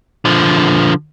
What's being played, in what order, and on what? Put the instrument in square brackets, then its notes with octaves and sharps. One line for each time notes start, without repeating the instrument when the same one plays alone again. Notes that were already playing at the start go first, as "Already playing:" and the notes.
[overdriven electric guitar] D3 F3